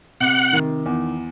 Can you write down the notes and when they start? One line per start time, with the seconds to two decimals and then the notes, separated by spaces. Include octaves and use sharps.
0.20 C3 F#5
0.53 D#3
0.86 E2